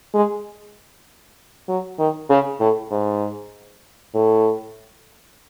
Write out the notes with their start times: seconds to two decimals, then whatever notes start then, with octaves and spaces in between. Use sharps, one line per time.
0.14 G#3
1.69 F#3
1.99 D#3
2.29 C#3
2.60 A2
2.91 G#2
4.14 A2